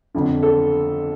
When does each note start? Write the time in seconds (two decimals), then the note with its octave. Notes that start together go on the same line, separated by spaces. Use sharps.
0.15 G1 F2 D3
0.43 A4